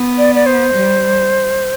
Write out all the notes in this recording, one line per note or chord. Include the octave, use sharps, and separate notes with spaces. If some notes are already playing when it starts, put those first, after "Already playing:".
Already playing: B3
D5
D5
C5
G3